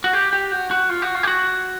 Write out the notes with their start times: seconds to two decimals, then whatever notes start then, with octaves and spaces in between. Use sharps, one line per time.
0.04 F#4
0.13 G4
0.33 G4
0.52 F#4
0.71 F#4
0.89 F4
1.02 F#4
1.15 F4
1.23 G4
1.27 F#4